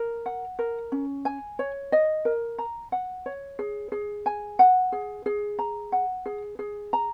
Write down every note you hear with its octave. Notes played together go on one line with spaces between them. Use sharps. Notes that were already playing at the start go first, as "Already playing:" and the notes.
Already playing: A#4
F#5
A#4
C#4
G#5
C#5
D#5
A#4
A#5
F#5
C#5
G#4
G#4
G#5
F#5
G#4
G#4
A#5
F#5
G#4
G#4
A#5